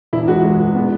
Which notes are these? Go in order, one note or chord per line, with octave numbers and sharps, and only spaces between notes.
E1 E4
G#3 F#4
G#3
E2
B3